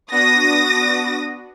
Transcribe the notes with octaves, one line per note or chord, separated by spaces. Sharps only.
B3 D4 F#4 D#6 A#6